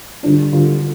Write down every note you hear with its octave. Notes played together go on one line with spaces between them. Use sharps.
D3 G3 D4 F4
D3 G3 D4 F4